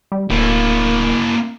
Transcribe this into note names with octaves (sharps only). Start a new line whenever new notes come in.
G3
D1 A#3 E4